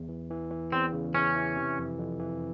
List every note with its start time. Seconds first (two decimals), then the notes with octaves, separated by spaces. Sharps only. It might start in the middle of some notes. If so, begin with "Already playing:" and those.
Already playing: E2
0.09 E3
0.30 E3
0.51 E3
0.72 E2 C4
0.93 C#3
1.14 E3 C#4
1.36 E3
1.56 C3
1.78 F2
1.99 F2
2.20 E3